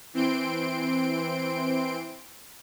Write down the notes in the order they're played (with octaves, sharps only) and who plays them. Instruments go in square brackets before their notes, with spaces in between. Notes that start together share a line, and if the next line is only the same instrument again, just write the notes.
[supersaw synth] E3 C4 C6 D7